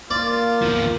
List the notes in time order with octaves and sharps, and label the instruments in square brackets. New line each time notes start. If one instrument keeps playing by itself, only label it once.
[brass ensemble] A#3 [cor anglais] F4 [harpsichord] D5
[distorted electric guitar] F3 B3